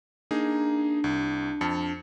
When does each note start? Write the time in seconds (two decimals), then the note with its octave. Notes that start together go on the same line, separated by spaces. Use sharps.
0.31 A#3 D4 D#4 G#4
1.04 C2
1.61 F2 A5 C#7